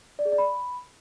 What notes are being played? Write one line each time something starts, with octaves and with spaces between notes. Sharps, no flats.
D5
G#4
D5
B5